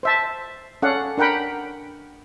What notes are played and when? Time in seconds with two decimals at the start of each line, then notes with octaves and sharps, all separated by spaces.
0.03 C5 E5 A5
0.82 C#4 A4 D5 F5 F#5
1.18 D4 A#4 F#5 G5 B5